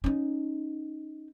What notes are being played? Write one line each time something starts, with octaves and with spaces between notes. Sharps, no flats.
C#4 D#4